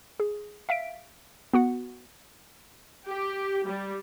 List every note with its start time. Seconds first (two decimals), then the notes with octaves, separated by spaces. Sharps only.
0.20 G#4
0.69 E5 F5 B6 D7
1.54 B3 F#4 F#5
3.08 G4
3.67 G3